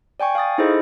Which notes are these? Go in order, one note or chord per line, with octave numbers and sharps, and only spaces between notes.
D5 G5 G#5 C#6
F5 C#6 D#6 A6
D#4 E4 G#4 A4 C5 D#5